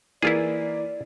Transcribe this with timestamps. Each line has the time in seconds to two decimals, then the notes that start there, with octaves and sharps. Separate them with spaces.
0.22 E3 A#3 E4 F4 G#4 D5